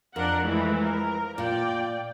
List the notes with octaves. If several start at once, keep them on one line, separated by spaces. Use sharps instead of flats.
F2 D4 A#4 F#5
E3 G#3 A3
A#4
A#2 D5 G5